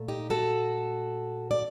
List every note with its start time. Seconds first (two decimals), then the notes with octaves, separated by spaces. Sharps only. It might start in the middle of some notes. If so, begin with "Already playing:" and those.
Already playing: A#2 A3
0.08 D#4 G4
0.30 F#4 A4
1.51 D5